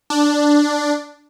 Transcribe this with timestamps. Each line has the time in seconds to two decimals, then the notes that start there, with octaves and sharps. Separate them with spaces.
0.10 D4